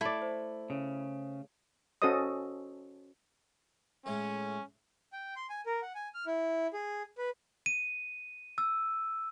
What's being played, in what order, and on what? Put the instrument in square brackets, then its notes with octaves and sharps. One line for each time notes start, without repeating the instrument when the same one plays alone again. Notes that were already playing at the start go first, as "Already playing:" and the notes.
[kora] A3 D5 [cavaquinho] E4
[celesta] C5
[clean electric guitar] C#3
[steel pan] C#4 F#4 A4 C5 D#5 D#6
[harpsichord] A2 G#3 [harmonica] C#4
[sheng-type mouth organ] G5
C6
G#5
A#4
F#5
G#5
F6
E4
G#4
B4
[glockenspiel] D#7
E6